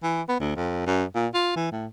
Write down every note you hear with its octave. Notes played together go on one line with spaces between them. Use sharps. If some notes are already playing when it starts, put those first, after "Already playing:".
E3
B3
D2
F2
F#2
A#2
F4
E3
A2